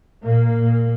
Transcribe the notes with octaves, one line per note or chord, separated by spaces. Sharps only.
A#2 A#3
A#2